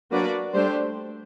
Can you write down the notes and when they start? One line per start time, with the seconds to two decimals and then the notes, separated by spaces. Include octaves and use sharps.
0.11 F#3 A#3 D4 F#4 B4 D5
0.54 G3 A3 D4 G4 C5